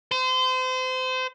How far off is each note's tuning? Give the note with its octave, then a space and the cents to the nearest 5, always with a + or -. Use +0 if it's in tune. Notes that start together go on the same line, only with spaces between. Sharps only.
C5 -30